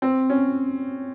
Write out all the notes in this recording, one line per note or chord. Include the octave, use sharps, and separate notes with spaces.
C4
C#4